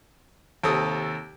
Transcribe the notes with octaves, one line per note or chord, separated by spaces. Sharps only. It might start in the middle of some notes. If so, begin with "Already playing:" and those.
D#2 C3 A4 D#6